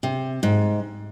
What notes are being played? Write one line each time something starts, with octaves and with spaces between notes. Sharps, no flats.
C3
G#2